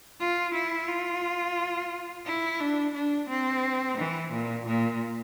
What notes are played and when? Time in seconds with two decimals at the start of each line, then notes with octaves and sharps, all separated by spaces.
0.20 F4
0.54 E4
0.88 F4
2.26 E4
2.60 D4
2.94 D4
3.29 C4
3.98 E3
4.32 A#2
4.66 A#2